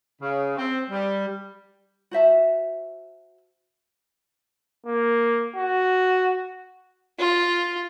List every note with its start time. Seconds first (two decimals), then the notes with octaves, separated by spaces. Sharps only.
0.22 C#3
0.57 C4
0.90 G3
2.11 F#4 C5 E5 A5
4.86 A#3
5.56 F#4
7.19 F4